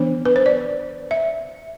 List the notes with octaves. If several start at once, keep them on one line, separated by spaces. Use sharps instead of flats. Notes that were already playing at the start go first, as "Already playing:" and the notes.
Already playing: E3 B3 D4 C5
B4
C5
D5
E5